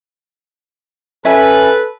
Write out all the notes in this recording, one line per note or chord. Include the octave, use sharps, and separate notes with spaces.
C#4 A4 B4 E5 G#5